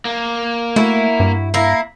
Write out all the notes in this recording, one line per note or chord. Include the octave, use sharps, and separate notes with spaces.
A#3
A3 E4 F#4
G2
A#3 E4